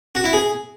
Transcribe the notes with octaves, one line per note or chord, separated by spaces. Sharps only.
F#4
E4
G#4